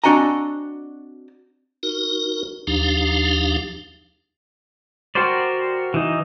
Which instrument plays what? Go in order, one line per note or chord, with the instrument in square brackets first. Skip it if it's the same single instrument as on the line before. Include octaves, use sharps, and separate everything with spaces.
[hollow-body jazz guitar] C4 D4 F#4 D#5 G#5 A#5
[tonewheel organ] D#4 F#4 A#4
D#2 F3 D4 D#4 G4 F5
[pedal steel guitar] F#4 G4 A#4 C5 D5
E3 D#4